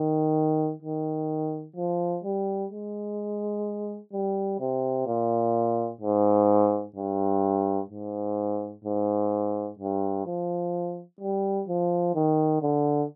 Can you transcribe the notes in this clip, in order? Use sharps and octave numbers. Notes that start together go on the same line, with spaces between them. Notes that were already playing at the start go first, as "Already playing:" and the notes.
Already playing: D#3
D#3
F3
G3
G#3
G3
C3
A#2
G#2
G2
G#2
G#2
G2
F3
G3
F3
D#3
D3